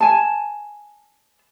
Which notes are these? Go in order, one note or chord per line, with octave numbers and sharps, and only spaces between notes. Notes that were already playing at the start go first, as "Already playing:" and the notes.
G#5 A5